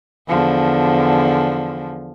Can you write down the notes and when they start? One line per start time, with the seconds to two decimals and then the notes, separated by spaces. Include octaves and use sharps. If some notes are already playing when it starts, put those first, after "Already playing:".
0.28 E2 D3 F3